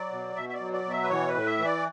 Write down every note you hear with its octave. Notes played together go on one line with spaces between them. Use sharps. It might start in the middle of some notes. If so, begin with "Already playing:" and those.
Already playing: F#3 D5
B2
B2 E5
E5
D5
F#3
D5
B2
E5
B4
E3 C#5
B4
A2
E5
E3
D5